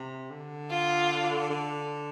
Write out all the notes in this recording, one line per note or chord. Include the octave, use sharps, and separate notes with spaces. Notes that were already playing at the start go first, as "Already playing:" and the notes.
Already playing: C3
D3
F4
D3